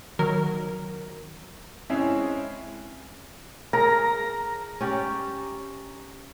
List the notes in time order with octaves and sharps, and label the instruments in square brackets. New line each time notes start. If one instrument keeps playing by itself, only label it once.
[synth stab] D#3 F#3 A#4
[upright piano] G#3 C4 C#4 E4 G#4
[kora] G#4 A#4 [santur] A#5
[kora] C#4 G4 D5